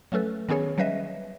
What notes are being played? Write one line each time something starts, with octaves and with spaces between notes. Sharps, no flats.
F#3 A3 C#4 A4 B4
D#3 B3 C#4 G#4 C#5
F#3 G3 C#4 B4 D#5 E5